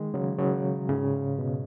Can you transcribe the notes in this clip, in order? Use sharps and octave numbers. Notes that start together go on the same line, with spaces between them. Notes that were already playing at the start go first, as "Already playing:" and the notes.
Already playing: D#3 G#3
C#3 F#3
C#3 F#3
G#2 C#3
B2